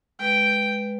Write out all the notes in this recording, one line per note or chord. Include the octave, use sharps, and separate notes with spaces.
G#3 B4 G5